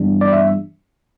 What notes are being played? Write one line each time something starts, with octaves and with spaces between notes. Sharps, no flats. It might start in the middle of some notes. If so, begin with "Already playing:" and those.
Already playing: G2 E3 G3 B3 D4
D5
E5